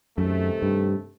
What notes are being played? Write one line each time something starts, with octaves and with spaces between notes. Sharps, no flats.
F#2 C3 D#3 A3
G2